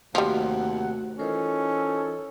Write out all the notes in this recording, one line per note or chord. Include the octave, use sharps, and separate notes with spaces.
D#2 C3 F3 G3 A3 F#4 F#5
E3 C#4 D#4 F4 A4 A#4 C5